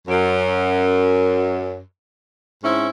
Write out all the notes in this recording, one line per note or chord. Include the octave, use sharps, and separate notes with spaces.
F#2
G#2 C4 C#4 E4